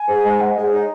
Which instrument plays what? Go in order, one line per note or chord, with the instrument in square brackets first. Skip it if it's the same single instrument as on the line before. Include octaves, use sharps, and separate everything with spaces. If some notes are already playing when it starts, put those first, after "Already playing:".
Already playing: [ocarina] G#5
[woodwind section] G#2
G#3
[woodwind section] G#3 [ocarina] F#5
[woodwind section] G#3 [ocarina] D#5
[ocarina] C5
[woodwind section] D#4 [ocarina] C#5